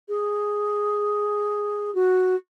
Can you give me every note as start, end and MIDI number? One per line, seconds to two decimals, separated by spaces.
0.09 1.93 68
1.95 2.35 66